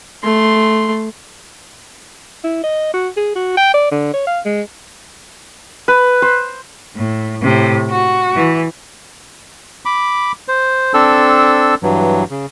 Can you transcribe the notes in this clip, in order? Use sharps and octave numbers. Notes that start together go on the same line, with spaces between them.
A3 C6
E4
D#5
F#4
G#4
F#4
G5
D5
D3
C#5
F5
G#3
B4
C5
A2
A2 C3
F#4
E3
B5 D6
C5
C4 D4 A4 E6
G2 E3 F#3
C#3